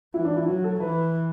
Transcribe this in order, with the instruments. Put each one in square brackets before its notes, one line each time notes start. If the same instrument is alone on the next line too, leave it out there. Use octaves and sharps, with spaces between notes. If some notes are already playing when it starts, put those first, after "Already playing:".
[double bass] E3 [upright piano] E4
[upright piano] D4
E4
[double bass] F#3 [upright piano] F#4
[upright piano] A4
[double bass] E3 [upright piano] B4